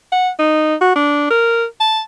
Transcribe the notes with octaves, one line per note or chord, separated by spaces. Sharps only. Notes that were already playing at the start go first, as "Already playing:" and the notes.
F#5
D#4
F#4
D4
A#4
A5